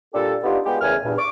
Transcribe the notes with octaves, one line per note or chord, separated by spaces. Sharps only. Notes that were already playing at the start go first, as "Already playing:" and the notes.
A#2 G3 D4 G4 A4
B3 D4 D#4 F4 G4
G#3 B3 F4 G4
E2 C#3 A3 A#4 G#5 F6
E2 G2 A#2
C#6 D6